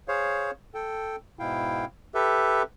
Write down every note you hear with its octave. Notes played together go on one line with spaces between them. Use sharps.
G#4 C5 C#5 F5
A4 G5
G#2 B2 E4 F5 G5
G4 A4 B4 E5